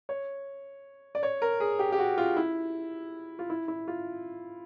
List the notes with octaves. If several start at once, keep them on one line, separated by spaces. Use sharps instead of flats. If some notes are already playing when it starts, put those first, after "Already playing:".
C#5
D5
C#5
A#4
G#4
G4
G4
F#4
F4
E4
F4
E4
E4
F4